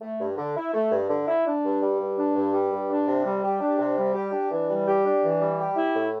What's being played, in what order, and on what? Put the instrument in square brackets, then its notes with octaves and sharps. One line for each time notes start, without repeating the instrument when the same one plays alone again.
[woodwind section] A3
G2
D3
E4
A3
G2
D3
E4
D4
G2
G3
G2
D4
G2
G3
G2
D4
C3
G3
G4
D4
C3
G3
G4
D4
E3
G3
G4
D4
E3
G3
G4
E4
A2